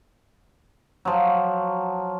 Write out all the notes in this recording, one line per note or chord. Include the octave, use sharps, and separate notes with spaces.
F3 F#3